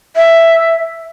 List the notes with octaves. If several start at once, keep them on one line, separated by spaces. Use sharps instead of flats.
E5